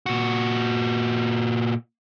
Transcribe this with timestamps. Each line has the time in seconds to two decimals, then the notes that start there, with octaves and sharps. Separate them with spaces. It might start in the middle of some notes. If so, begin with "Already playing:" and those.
0.06 A#2 F#4